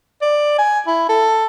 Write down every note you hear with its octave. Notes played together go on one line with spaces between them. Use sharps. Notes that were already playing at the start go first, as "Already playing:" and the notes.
D5
G#5
E4
A4